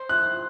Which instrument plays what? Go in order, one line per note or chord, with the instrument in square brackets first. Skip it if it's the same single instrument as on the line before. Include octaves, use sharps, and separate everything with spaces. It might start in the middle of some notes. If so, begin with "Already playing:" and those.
Already playing: [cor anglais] C5
[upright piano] F#6